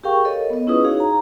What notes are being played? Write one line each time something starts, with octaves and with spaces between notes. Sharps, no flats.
G4 G#4 A#4 F5 G5 C#6
A4 A#4 C#5 D#5
B3 D#5
C#4 E4 F4 G#4 B4 D#6
D#4 F#4 G#4 C#5 F5
A#5